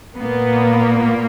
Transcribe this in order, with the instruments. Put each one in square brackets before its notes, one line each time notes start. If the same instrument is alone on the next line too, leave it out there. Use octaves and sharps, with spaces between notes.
[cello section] A#2 A#3 B3